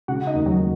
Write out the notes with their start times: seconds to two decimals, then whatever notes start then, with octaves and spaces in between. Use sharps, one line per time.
0.08 C#3 F#4 F#5
0.27 D#4 D#5
0.34 D#2
0.46 F#3 F#4
0.59 A#3